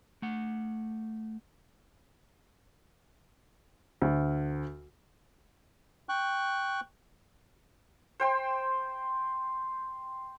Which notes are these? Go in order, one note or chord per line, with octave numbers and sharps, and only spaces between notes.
A3 F#5
D2
G5 C#6 F#6
C5 G5 C6